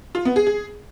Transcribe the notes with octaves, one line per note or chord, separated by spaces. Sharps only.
F4
B3
G#4
G#4